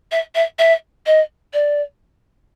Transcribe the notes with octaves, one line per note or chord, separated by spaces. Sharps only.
E5
E5
E5
D#5
D5